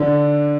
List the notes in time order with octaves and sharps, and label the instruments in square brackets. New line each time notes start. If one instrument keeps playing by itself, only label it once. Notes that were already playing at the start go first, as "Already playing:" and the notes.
Already playing: [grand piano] D3